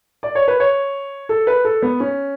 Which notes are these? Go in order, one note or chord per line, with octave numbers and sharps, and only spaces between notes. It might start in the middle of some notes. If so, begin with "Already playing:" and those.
D5
C#5
B4
C#5
A4
B4
A4
B3
C#4